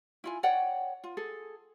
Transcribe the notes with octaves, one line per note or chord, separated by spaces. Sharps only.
E4 F4 G#5
C#5 D5 F#5 G5
F4
G#4 A4